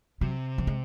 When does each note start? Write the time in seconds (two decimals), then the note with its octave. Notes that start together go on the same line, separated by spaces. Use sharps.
0.21 C3 F#3
0.58 F#3
0.67 G#3